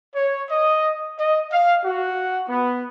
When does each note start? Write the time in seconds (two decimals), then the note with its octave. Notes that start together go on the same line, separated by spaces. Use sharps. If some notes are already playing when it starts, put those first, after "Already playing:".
0.14 C#5
0.50 D#5
1.18 D#5
1.52 F5
1.84 F#4
2.49 B3